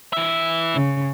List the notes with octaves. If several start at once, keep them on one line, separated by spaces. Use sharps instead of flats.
E3 E5
C#3